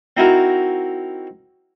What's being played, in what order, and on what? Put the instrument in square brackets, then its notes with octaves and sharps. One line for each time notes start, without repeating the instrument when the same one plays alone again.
[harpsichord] C4 D#4 E4 F#4 A#4